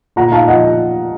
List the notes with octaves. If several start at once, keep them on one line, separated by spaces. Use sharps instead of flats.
A#2 F#5 A#5
D#4 F5 A5
F3 D#5 F#5